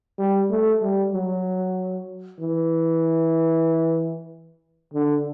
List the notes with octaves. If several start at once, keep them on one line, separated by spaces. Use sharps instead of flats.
G3
A3
G3
F#3
E3
D3